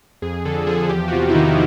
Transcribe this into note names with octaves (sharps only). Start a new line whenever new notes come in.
F2 G#4
D3 A4
F3 G#4
E2 G4
F#4
C3 F4
E4
D#3 D#4